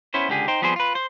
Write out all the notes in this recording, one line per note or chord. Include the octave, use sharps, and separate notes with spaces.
B3 C#4 E4 C5
C#2 D3 G4 G#4
D#4 C5 G5
F3 G3 B3 C4 G#4 C5
F4 B4
C5